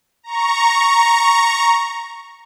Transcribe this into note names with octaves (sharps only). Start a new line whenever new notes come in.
A#5 C#6